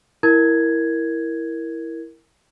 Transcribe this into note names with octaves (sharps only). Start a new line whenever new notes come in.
E4 A#4 G#6